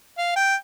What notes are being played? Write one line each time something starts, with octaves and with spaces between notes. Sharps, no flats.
F5
G5